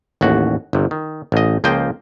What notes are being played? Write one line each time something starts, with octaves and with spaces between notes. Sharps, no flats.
A1 D#2 F#4
G1 C3
D#3
A1 D#5
C#2 F3 A#3 C5 D#5 G5